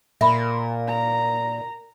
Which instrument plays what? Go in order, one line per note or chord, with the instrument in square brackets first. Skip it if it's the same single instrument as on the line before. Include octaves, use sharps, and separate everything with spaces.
[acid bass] A#2 [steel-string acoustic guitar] A#4 [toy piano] E5 B5
[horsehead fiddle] A#5